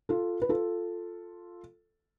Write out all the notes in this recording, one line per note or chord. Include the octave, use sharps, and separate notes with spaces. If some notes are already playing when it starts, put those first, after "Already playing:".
F4 A4
B4
F4 A4